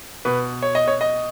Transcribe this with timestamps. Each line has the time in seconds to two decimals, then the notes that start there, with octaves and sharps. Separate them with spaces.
0.25 B2 B4
0.62 C#5
0.75 D#5
0.88 C#5
1.01 D#5